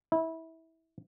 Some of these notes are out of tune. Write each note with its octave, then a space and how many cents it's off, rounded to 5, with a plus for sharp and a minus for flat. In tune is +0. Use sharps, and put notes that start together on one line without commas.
E4 -25